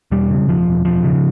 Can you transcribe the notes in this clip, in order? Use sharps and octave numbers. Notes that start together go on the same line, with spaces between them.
E1 G3
C#3
E1 F3
E1
E1 F3
C#3